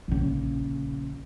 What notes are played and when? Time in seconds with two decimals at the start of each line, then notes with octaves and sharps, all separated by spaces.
0.08 A#1 C#3